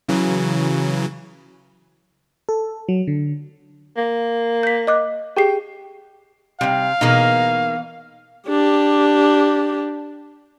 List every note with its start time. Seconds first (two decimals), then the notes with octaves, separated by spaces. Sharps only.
0.09 C#3 E3 F#3
2.49 A4
2.89 F#3
3.07 D3
3.97 A#3
4.63 G6 B6
4.87 D#5 D6 F#6
5.37 G4 G#4 G5 C7
6.61 C3 G3 D#4 F5
7.01 B2 E3 A#3 D#4 G#4
8.48 D4 G4